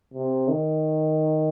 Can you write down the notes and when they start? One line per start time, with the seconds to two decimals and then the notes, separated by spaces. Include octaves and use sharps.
0.14 C3
0.48 D#3